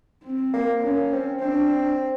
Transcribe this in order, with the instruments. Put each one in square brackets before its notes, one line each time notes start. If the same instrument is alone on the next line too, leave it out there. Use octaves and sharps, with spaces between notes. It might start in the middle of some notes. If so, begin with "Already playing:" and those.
[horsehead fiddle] C4
[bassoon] A#3
[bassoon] A#3 [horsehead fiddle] C#4
[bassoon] C4
[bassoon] C4 [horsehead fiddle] D4